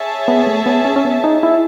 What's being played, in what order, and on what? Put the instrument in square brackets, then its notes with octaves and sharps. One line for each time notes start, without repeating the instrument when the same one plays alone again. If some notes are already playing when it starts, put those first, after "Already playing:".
Already playing: [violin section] G#4 C#5 E5 A5
[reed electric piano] B3
A3
B3
C#4
C#4
B3
D#4
E4